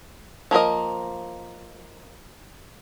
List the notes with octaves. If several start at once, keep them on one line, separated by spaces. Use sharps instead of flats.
F3 A#3 G#4 A#4 D#5